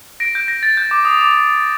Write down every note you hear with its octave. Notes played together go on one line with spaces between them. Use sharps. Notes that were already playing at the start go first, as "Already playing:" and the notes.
A#6 D7
G6
A#6
A6
G6
D6
D#6
D6
D#6